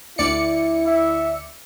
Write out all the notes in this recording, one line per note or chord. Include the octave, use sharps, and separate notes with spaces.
D2 E4 D5 C#7
E5